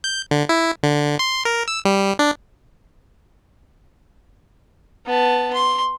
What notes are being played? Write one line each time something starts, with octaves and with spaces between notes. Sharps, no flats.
G6
D3
E4
D3
C6
A#4
E6
G3
D4
B3 A5
C6